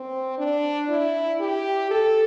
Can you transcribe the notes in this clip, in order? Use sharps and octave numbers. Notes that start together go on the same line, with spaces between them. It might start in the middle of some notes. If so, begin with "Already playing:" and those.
Already playing: C4
D4
E4
G4
A4